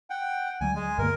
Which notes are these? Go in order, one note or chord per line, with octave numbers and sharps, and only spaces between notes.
F#5 G5
D2 F#3 G3 G#5
G#3 G#5
G2 D3 A#3 A#4